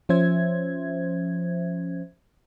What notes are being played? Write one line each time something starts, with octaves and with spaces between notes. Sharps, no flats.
F3 C#4 C5 E5 G#6